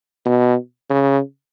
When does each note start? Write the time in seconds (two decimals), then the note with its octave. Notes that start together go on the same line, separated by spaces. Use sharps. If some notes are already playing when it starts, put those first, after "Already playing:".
0.26 B2
0.90 C#3